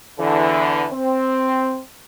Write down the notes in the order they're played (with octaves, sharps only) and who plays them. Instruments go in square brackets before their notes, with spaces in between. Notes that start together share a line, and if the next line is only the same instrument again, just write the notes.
[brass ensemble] E2 D3 E3
C4